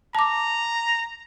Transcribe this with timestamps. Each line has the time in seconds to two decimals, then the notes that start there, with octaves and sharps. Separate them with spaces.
0.15 A5 A#5 D6